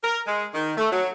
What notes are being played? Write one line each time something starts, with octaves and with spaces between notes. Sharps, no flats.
A#4
G#3
D#3
A3
F#3